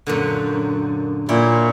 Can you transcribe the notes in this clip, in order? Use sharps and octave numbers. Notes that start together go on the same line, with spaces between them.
F#2 A#2 D3
A#2 E4 C#5 G5